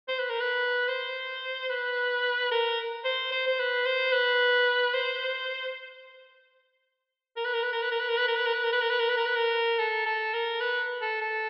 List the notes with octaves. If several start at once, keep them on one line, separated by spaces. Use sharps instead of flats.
C5
B4
A#4
B4
C5
B4
A#4
C5
C5
C5
B4
C5
B4
C5
A#4
B4
A#4
B4
A#4
B4
A#4
B4
A#4
B4
A#4
B4
A#4
B4
A#4
B4
A#4
B4
A#4
B4
A#4
B4
A#4
A4
A4
A#4
B4
A4
A4